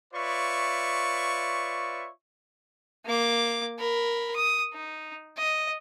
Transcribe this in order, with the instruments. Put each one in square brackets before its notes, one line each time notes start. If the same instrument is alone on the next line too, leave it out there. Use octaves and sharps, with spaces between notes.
[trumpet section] F4 B4 C#5 D5 E5 C#6
[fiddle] A#3 D6
A#4 B5
D#6
D#4
D#5